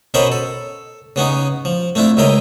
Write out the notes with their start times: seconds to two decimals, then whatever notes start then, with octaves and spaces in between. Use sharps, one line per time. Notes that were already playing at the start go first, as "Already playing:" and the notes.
0.14 B2 C#4 A#4 C5 D#5 B5
0.32 A4
1.16 C#3 B3 C#4 D#4
1.65 F3
1.95 A3 C4 D4 E4 F4
2.17 C#2 C#3 E4 A#4 D#5 G5